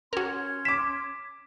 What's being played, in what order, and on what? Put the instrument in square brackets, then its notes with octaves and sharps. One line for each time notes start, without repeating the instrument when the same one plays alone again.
[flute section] C#4 C6 G#6 [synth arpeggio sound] F#4 A#4
[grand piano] D6 E7 [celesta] B6